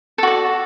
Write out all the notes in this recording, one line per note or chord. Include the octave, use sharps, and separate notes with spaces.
F#4 A4 D5